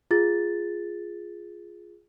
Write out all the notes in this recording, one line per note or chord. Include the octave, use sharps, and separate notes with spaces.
F4 G#4 A6